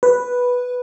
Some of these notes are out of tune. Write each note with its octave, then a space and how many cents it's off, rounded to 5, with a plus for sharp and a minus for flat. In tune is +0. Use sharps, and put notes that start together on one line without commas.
B4 -5